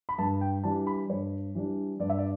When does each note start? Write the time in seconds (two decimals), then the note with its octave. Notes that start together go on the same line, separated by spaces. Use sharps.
0.09 B5
0.18 G2 A5
0.41 G5
0.64 E3 G3 D4 A5
0.87 B5
1.09 G2 C#5
1.55 E3 G3 D4
2.00 G2 D5
2.09 E5
2.18 D5